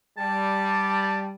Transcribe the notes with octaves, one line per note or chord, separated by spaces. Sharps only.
G3 A5